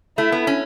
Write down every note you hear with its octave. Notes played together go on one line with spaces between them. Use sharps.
A3 E4
B3
C#4